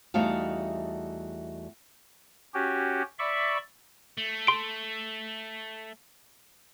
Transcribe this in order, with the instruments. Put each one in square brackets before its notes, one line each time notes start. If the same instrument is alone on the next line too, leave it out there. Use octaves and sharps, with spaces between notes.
[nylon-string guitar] E2 G3 A3 D#4 F#4 F5
[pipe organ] C#4 F#4 G4
D5 E5 B5 C#6
[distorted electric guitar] A3
[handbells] C6 D7